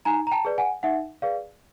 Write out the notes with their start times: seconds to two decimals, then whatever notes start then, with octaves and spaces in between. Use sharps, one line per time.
0.05 D#4 G#5 A#5
0.27 A#5
0.31 G5 A5
0.45 G#4 B4 D5
0.58 F#5 G#5
0.83 D#4 E5 F#5
1.22 G#4 B4 D5 F5